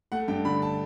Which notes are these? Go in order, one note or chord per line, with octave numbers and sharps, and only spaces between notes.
A3 F#5
G2 G5
D3 B5
A5